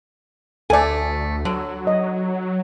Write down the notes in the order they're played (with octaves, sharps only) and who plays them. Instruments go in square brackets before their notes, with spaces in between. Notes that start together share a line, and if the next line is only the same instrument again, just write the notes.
[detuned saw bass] D2 [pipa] A3 G#5 [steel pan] A4 D5
[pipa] D3 [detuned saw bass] F#3
[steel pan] D#5